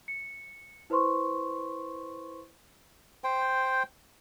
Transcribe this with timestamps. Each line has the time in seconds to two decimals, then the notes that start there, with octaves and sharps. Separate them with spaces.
0.08 C#7
0.90 E4 B4 C5 C6 C#6
3.24 C5 G5